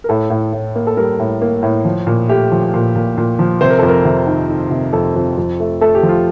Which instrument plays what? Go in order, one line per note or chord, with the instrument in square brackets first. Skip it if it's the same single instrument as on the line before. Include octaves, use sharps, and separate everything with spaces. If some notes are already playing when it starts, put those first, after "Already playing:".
[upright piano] A#4
A2 A4
A2
A2
A#3
A4
G3 A#4
A2
A#3
A2
F3
A#2
A3 G4
F3
A#2
A#2
A#2
F3
C3 C5
A#4
F2 A4
A#4
C3
D#3
D#3
C3
F2 A4
F2
F2
A3
A3 A4
G4
F3
F4